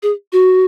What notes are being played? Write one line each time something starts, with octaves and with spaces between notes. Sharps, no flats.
G#4
F#4